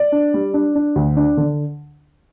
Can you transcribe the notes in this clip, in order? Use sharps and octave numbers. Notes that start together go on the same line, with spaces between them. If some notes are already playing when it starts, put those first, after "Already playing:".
Already playing: D5
D4
G3
D4
D4
D2
D4
D3